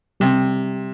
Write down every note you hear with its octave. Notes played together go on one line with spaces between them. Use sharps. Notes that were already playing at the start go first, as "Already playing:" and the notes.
C3 G3